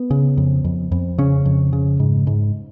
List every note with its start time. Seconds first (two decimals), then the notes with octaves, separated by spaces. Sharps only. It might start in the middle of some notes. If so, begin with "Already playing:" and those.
Already playing: B3
0.11 C#3
0.37 F2
0.64 F2
0.92 F2
1.18 C#3 C#4
1.45 F2
1.73 C#3
2.00 G#2
2.27 G#2